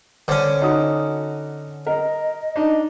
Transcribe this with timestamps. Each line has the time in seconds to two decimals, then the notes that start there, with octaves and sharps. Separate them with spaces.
0.28 D3 C#4 C5
0.62 D#4 F#4 D#6
1.87 A#4 D#5
2.56 D4 D#4